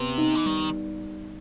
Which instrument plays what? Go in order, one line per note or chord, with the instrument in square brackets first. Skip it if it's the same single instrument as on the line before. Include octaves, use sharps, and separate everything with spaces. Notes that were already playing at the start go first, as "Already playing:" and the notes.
Already playing: [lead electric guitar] C3 [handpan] B3
[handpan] D#4
[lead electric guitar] E3
[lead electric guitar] D#3 [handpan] G3